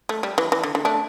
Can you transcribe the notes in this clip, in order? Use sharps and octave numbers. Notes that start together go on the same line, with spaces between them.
A3
G3
E3
E3
D3
D3
A3 D4